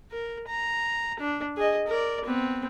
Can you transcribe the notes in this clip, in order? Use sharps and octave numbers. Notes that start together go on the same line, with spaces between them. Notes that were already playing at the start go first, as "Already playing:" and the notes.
A#4
A#5
D4
G#4 D#5
A#4 D5
B3 C4